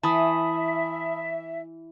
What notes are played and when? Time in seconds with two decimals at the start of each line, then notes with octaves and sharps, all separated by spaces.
0.03 E3 E5 A5 B5 D#6